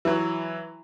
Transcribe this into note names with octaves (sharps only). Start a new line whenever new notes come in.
E3 F#3